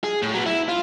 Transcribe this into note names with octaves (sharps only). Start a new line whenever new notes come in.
G#4
A2
F#3 B3
E4
F4